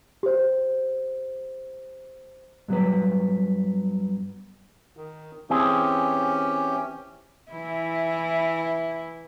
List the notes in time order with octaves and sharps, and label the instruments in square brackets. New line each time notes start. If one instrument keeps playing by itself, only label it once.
[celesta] G4 C5
[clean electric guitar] G2 F#3 B3 B4
[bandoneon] D#3
[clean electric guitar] E3 C4 G#4 [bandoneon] C#4 G4
[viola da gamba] E3 E4